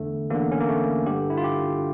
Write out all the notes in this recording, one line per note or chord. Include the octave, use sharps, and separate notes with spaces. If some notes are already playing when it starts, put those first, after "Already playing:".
Already playing: E2 D3 A3
E2 D3 A#3
C#4
A#3
A3
G2 D3 G4
E4
F4
G4